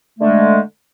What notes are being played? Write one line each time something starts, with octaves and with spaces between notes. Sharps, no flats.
D3 G#3 A3